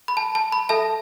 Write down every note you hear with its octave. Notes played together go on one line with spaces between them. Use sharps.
B5
A5
A5
B5
A4 E5 A5